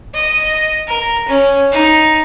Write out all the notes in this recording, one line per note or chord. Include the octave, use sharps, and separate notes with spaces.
D#5
A#4
C#4
D#4